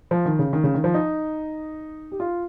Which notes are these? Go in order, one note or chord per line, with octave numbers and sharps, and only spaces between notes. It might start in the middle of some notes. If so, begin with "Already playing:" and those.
F3
D#3
C#3
D#3
C#3
D#3
F3
D#4
G4
F4